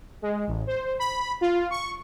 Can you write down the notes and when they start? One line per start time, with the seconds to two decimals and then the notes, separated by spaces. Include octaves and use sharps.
0.22 G#3
0.47 A1
0.67 C5
0.99 B5
1.41 F4
1.70 C#6